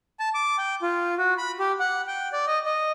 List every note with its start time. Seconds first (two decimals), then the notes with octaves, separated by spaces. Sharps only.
0.20 A5
0.35 D6
0.58 G5
0.82 F4
1.18 F#4
1.38 B5
1.59 G4
1.79 F#5
2.08 G5
2.33 D5
2.47 D#5
2.65 D#5